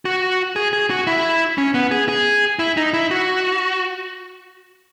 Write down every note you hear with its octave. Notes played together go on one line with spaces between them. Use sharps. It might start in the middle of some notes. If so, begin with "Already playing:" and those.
F#4
G#4
G#4
F#4
E4
C#4
B3
G#4
G#4
E4
D#4
E4
F#4